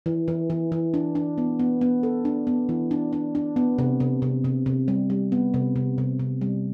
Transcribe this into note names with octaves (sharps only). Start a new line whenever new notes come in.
E3
E3
E3
E3
D4
D4
B3
B3
B3
A4
D4
B3
E3
D4
D4
D4
B3
C3
C3
C3
C3
C3
G3
G3
B3
C3
C3
C3
C3
G3